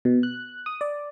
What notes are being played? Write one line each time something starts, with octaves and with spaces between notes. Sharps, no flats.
B2
F#6
D#6
D5